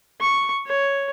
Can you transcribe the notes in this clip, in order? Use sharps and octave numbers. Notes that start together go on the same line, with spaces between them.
C#6
C#5